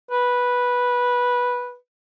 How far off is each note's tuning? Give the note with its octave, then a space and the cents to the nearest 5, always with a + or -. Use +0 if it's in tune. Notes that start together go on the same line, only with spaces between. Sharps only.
B4 -10